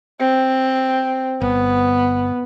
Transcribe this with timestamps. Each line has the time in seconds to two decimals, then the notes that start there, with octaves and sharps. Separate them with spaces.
0.20 C4
1.41 G1 B3